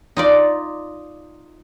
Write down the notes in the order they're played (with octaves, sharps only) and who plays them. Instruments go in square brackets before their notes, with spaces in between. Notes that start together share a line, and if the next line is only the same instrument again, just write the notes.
[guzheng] D#4 F4 D5